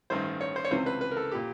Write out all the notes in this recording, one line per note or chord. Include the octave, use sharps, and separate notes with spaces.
A1 G2 D#3 C5
C#5
C5
C#5
C#2 C3 E3 C5
B4
B4
A#4
A4
A#2 G4